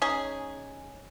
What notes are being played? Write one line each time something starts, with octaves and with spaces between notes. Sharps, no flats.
C#4 D#4 G#4 G#5